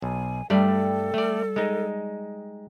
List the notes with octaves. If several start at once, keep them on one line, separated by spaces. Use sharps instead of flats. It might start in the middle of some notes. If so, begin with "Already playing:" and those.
B1 G#5
G2 G3 A3 A4 D5
A3 D5
G#3 D#4